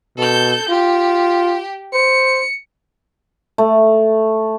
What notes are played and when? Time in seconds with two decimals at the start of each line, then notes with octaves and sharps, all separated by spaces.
0.17 B2 A4 G6
0.69 F4 G4
1.93 C5 C#7
3.58 A3